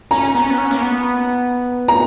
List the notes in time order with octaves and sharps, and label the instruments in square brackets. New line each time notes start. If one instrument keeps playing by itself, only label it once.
[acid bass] C#4 [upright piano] A#5
[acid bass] B3
C#4
B3
C#4
A#3
B3
[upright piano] A#5